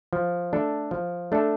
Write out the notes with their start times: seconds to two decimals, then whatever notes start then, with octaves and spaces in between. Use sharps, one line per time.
0.13 F3
0.53 A3 D4 A4
0.91 F3
1.32 A3 D4 A4